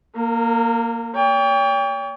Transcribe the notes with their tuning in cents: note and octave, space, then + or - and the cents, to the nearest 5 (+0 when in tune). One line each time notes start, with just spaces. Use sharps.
A#3 +0 A#4 -35
C#5 +45 G5 +25